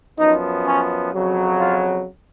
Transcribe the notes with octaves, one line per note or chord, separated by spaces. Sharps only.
F#2 F3 B3 D#4
C#4
F2 C#3 F#3
F4